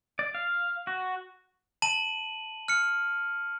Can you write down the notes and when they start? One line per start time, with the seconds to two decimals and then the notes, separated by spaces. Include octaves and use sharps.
0.19 D5
0.35 F5
0.87 F#4
1.82 A5 D#7 F#7
2.68 F6 C#7